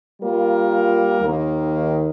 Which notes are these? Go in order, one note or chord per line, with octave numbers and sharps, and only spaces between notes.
G3 A#3 F4 A#4
D#2 D#3 A#3